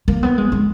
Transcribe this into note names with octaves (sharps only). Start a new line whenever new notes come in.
A#3
B3
G#3
G#3